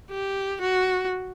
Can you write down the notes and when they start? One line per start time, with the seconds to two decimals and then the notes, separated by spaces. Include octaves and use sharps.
0.10 G4
0.61 F#4